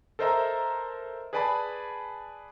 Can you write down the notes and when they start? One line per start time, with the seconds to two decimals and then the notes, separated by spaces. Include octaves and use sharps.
0.19 A4 A#4 C5 D#5 E5 A#5
1.33 G#4 B4 D5 G#5 A5 B5